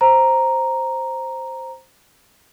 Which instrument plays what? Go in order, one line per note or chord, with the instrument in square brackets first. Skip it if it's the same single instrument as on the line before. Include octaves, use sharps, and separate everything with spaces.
[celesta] C5 A#5